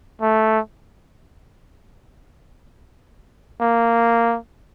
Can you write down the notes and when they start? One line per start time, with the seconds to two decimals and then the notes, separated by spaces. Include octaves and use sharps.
0.21 A3
3.61 A#3